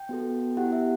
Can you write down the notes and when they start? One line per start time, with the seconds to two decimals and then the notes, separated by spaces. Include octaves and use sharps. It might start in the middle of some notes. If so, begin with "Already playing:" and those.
Already playing: G5
0.09 B3 F#4 A4
0.57 B3 E4 G4 F#5
0.72 E5